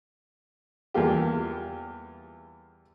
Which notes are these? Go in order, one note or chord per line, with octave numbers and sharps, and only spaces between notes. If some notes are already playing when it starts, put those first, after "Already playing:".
E2 G3 A#3 F4 G4